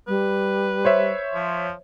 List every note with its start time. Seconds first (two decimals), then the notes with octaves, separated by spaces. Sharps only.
0.08 G3 B4
0.85 C5 C#5 E5
1.34 F3